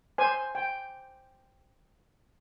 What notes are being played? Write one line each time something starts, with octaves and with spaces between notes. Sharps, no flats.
C5 G#5
G5